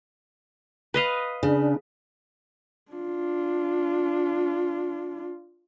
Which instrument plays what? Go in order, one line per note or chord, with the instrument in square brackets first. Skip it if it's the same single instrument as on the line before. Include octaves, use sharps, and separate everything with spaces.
[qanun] B4 D#5 F5
[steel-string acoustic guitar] C#3 [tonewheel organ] D4
[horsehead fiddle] D4 F4